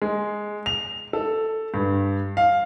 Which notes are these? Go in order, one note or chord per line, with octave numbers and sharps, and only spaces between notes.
G#3
F7
A4
G2
F5